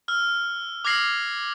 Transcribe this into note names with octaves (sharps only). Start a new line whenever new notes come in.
E6 F6
D6 F6 G#6 A#6 C7 F#7